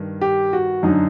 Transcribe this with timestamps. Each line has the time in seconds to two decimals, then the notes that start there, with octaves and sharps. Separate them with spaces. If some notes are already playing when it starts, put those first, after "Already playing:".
Already playing: G2 D#3
0.21 G4
0.53 F#4
0.83 F#2 D3 D#4